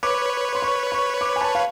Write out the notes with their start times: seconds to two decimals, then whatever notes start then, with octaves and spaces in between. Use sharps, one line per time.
0.03 B4 C#5 D6
0.55 C6
0.62 C#6
0.92 C#6
1.21 D6
1.36 G#5
1.42 A5
1.55 F5